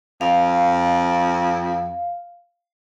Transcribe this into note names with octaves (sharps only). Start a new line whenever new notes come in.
F2 F5